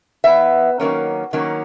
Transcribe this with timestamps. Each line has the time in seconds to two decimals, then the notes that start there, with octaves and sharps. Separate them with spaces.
0.24 E3 B3 E5
0.80 D#3 F#3 A#3 C#4
1.33 D#3 F#3 A#3 C#4